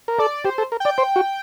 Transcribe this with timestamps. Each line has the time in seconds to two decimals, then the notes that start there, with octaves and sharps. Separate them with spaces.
0.08 A#4
0.19 A4 D5
0.45 G4 C5
0.58 A4
0.72 A#4
0.80 D5 G5
0.98 C5
1.16 F#4